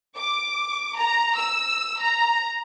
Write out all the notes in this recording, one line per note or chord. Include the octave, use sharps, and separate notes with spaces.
D6
A#5
E6
A#5